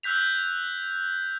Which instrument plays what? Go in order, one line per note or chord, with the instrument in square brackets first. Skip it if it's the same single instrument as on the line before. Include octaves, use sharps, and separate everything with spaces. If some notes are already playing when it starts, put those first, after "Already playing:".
[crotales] E6 F#6 G6 B6 F7